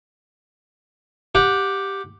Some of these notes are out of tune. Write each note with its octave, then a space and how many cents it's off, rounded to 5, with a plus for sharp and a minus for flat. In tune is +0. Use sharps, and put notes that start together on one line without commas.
G4 +0 F#5 -15